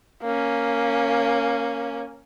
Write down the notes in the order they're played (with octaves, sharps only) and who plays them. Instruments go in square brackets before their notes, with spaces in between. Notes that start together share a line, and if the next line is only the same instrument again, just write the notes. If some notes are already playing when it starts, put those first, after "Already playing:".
[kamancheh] A#3 C#4